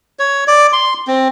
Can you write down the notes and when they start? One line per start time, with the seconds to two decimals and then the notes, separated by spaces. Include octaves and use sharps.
0.19 C#5
0.48 D5
0.73 C6
1.07 C4